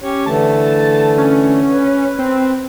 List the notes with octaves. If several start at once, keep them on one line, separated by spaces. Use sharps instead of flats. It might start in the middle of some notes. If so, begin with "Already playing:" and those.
C#4 G4 C#5
D3 E3 A3 A5
C#4
B4
C4